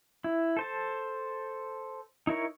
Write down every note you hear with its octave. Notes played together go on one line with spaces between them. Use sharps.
E4
A4 C5 A5
D#4 E4 A#4 C#5